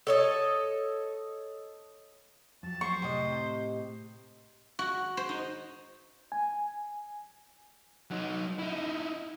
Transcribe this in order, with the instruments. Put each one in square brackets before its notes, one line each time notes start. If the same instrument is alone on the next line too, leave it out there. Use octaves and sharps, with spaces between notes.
[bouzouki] A4 C#5 D#5
[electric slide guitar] F2 F#3 [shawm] A5
[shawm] C5 [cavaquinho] C#6
[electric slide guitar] A2 [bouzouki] C3 D#5
[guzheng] F#4
C5
D#4
[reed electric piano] G#5
[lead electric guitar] F#3 D#4
D#4 E4